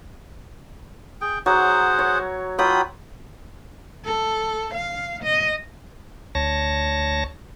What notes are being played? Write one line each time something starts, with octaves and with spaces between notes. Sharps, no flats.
G#4 G5
F#3 G#4 C5 F#5
C#5
F#3 F4 G5 B5 D#6
A4
F5
D#5
D2 C#5 A5 A#6